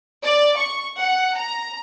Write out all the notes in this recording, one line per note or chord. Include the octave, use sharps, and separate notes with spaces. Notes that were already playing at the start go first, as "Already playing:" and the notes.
D5
C#6
F#5
A#5